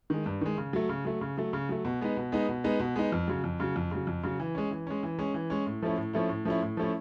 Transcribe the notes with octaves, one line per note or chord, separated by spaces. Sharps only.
D#3 G#3
G2
D#3 G#3
C#3
F#3 A3
C#3
F#3 A3
C#3
F#3 A3
C#3
F#3 A3
B2
G#3 B3 D#4
B2
G#3 B3 D#4
B2
G#3 B3 D#4
B2
G#3 B3 D#4
F2
C#3 F#3
F2
C#3 F#3
F2
C#3 F#3
F2
C#3 F#3
E3
G#3 C#4
E3
G#3 C#4
E3
G#3 C#4
E3
G#3 C#4
A2
F3 A3 C#4 E4
A2
F3 A3 C#4 E4
A2
F3 A3 C#4 E4
A2
F3 A3 C#4 E4